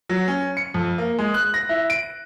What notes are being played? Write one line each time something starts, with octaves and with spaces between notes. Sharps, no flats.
F#3
C#4
C#7
F2
A#3
G#3
F#6
A#6
E4
D7